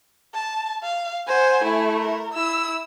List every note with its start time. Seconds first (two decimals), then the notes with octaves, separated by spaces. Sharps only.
0.34 A5
0.83 F5
1.27 C5 F#5 G#5
1.62 A3 E4
1.97 A#4
2.34 E4 E6